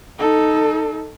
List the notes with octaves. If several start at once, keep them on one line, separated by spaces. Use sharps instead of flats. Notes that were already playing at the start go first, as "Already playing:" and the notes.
D#4 A4